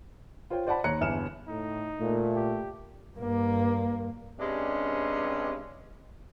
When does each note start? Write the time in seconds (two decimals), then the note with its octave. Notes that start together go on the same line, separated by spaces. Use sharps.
0.50 F4 C5 C#5 G5
0.67 C5 D5 F#5 A5 B5
0.84 D#2 C#5 A#5 F#6 C#7
1.01 G1 E2 E5 G#5 F6 E7
1.48 A2 D#4
2.00 A#2 A3 A#3
2.35 G4
3.17 G2 A#3
4.40 G2 C3 G#3 C#4 D4